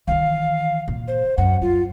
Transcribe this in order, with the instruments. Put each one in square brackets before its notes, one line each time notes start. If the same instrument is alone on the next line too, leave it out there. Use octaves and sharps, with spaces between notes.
[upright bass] D#3 E3 [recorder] F5
[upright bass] A#2
[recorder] C5
[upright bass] F#2 [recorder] F#5
[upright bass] F#2 [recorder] F4